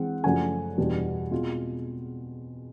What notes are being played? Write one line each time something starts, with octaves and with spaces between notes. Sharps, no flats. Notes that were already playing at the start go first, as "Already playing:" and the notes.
Already playing: E3 G#3 C4 F#5
F#2 C#3 F3 A3 D4 F#5 G#5
E2 B2 G3 B3 D4
B2 G#3 C4 F4